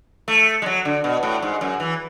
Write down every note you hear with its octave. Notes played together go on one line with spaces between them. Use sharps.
A3
G#3
F#3
D3
B2
A2
G#2
F#2
E3